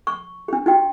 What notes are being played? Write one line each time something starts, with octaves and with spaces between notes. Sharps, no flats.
C#6
D4 G4
D#4 F#4 G5